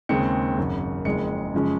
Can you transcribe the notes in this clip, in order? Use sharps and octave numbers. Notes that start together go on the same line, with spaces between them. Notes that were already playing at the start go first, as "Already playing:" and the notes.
D#2 C#3 G#3 C4 C#7
G#1 F#2 C#3
F#1 F2 C#3 G#3 C4 C#7
F#2 C#3 F3 G#3 C#4